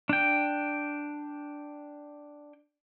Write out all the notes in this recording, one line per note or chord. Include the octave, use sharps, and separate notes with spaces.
D4 G5